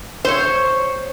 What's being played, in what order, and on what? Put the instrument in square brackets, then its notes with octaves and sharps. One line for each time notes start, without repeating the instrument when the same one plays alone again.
[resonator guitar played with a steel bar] C5 C#5